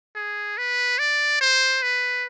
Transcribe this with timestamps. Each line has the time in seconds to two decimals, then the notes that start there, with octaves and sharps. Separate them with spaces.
0.16 G#4
0.58 B4
0.99 D5
1.41 C5
1.83 B4